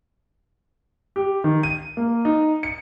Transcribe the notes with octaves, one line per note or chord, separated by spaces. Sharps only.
G4
D#3
D#7
A#3
D#4
C#7